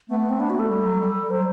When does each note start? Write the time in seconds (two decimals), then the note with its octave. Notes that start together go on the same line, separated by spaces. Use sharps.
0.09 A3 B3
0.19 B3
0.29 C4
0.39 B3 D4
0.50 F#4
0.55 A3 A4
0.69 G3
0.85 F#3
1.00 G3
1.25 G3
1.30 F#3 C5